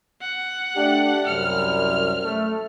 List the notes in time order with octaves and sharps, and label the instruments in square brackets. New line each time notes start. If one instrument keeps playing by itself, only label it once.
[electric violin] F#5
[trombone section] A3 D4 G4
[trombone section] C2 F#2 [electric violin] F6
[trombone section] A3